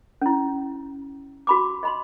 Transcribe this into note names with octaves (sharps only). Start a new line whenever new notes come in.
C#4 E4
F#4 B5 D6
D#5 B5 C6